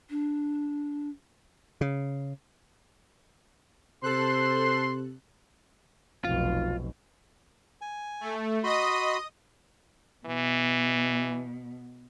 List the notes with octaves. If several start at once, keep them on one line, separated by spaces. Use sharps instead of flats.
D4
C#3
C3 A4 C5 C6 F#6
F1 B1 F4
G#5
A3
F#4 D#5 B5 C6 D#6
B2 E3